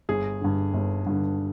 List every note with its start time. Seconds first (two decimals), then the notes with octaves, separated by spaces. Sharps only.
0.09 G1 G#4
0.41 G2 D3
0.74 G1
1.06 G2 D3